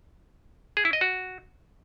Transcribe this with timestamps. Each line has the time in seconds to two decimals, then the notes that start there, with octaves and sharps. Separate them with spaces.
0.77 G#4
0.85 E4
0.93 D#5
1.01 F#4